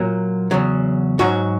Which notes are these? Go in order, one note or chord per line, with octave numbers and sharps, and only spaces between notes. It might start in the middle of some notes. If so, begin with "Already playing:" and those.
Already playing: A#2 F#3
E2 C#3 F#3
G#2 F#3 F#4